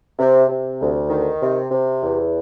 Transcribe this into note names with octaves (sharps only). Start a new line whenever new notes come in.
C3
C3
D2
D#3
C3
C3
E2